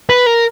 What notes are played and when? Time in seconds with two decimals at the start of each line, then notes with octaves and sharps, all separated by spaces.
0.10 B4
0.26 A#4